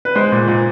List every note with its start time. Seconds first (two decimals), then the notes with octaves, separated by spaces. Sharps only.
0.05 B4
0.15 G#3 C5
0.32 A#2
0.48 A#2